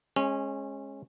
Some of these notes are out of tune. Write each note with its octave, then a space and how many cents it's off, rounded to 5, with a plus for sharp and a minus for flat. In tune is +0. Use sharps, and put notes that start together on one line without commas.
G#3 +5 C#4 -20